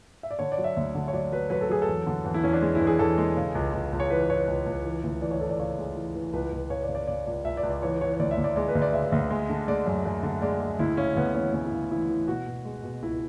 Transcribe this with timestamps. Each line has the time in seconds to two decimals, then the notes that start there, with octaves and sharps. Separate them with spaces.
0.23 E5
0.31 D5
0.39 D3 C#5
0.52 D5
0.58 F#3
0.64 E5
0.77 D2
0.95 D3
1.08 C#5
1.13 F#3 D5
1.32 F#3 B4
1.50 F#3 B4
1.61 A4
1.69 F#3 G#4
1.82 A4
1.87 E2
2.07 D3
2.25 E2
2.34 E4
2.43 E2 C#4
2.53 D4
2.62 G#3
2.75 E4
2.81 E2
2.87 G#4
2.99 E2 A4
3.18 G#3
3.37 C#3
3.55 C#2
3.73 C#2
3.93 C#2
4.00 C#5
4.10 E3 B4
4.29 E3 C#5
4.48 C#2
4.66 C#2
4.85 E3
5.04 D2
5.22 E3 D5
5.31 C#5
5.40 E3 A4
5.49 D5
5.59 C#3 C#5
5.78 G#3
5.96 E3
6.15 E3
6.33 C#2 B4
6.52 C#2
6.70 C#3 C#5
6.83 D5
6.89 C#3
6.95 D5
7.07 C#3 D5
7.26 C#2 D5
7.45 C#2 E5
7.57 D5
7.63 C#2
7.70 D5
7.82 E3 C#5
8.01 E3 C#5
8.14 C#5
8.19 D2 D5
8.31 E5
8.37 D2
8.44 D5
8.56 G#3 D5
8.69 B4
8.75 D2
8.82 D5
8.93 C#3 E5
9.12 D2
9.31 G#3
9.50 D3
9.68 G#3 D5
9.86 F#2
10.05 F#2
10.23 D3
10.42 G#3 D5
10.60 G#3
10.79 D2 E4
10.97 C#3 C#4
11.17 D2 B3
11.34 E3 C#4
11.53 D2 C#4
11.66 E4
11.72 C#3
11.91 E3 E4
12.09 E3
12.27 B2 F#4
12.47 B2
12.65 G#3
12.83 B2
13.02 C#2 E4